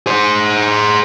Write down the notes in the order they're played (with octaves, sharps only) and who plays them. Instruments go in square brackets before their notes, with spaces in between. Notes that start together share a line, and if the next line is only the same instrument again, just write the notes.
[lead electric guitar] G#4 C5